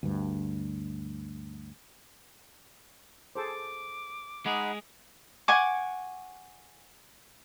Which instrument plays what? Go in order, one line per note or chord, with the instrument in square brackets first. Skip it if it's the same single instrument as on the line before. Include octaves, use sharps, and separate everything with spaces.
[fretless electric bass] D2 G2
[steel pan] G#4 A4 C5 [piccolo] D6
[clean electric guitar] G#3 G#4 [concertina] D#4 F#5 B5
[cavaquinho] F#5 G#5 C#6 D6